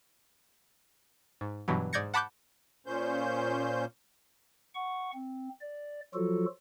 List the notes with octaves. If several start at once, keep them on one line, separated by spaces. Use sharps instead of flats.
G#2
G2 B2 E3 F#3
G#2 D5 G6 G#6 A#6 C#7
F#5 A5 B5 D6 F#6 G6
A#2 C#4 C5 G6
F#5 C#6
C4
D5
F3 F#3 F4 F#4 A4